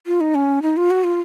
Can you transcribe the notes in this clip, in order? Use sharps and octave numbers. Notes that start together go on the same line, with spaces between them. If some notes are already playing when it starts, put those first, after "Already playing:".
F4
D#4
C#4
D#4
F4
F#4
F4